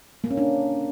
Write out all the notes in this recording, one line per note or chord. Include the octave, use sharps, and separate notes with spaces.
A#3
C#4
D4